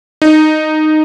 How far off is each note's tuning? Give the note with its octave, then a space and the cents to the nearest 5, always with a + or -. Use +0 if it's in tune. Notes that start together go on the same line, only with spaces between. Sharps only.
D#4 -10